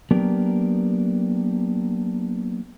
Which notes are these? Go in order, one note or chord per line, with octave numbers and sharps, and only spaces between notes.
F#3 A#3 B3 D4 G4 A#4